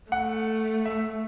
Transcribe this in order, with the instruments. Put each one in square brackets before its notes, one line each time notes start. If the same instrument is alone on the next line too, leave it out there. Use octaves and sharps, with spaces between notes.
[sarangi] A3 [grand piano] F#5
[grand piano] E5